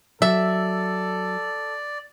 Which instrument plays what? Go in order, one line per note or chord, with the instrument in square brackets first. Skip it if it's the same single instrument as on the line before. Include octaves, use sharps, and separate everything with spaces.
[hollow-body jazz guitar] F#3 [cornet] A4 [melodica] D5 [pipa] E5